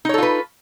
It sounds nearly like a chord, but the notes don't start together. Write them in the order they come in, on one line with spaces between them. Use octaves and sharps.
D#4 C#5 A4 F4 B4